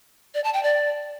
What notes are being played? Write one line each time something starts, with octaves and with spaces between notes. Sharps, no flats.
D5
A5
G5
D5